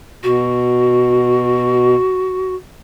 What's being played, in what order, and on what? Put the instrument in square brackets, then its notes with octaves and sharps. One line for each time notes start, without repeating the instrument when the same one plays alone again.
[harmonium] B2 [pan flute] F#4